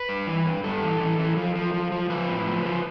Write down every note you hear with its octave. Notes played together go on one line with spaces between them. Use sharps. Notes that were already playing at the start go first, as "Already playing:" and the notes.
Already playing: B4
G2
E3
G2
G2 A4
E3
E3
E3
F3
F3
F3
F3
F3 B4
A2
F3
F3